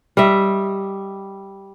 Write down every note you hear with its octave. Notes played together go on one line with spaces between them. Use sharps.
G3 D#5 E5